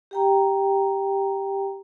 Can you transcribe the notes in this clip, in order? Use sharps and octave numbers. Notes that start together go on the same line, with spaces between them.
G4 G5 A#5